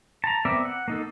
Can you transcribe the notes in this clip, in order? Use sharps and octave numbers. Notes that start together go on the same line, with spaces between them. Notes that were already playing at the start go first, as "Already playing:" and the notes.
A5 A#5
B3 C4 A#4 D5 E5
F#5
A#3 D#4 A4